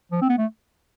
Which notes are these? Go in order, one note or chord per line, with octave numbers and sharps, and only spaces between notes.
F3
C4
B3
A3